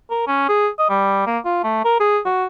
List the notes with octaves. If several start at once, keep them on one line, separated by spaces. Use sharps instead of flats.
A#4
C#4
G#4
D#5
G3
A#3
F4
A3
A#4
G#4
F#4